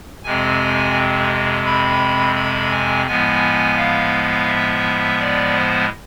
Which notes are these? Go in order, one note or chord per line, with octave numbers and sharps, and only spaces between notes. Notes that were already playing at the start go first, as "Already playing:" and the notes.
F2 C3 G#3 C4 G#5
B5
B5
G#5
A2 F3 G#3 B3 G#5
F5
E5
D5
C5